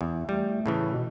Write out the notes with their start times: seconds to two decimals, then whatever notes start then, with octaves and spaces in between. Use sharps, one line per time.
0.01 E2
0.29 G3 A3
0.66 A2 C#3 E3
0.92 B2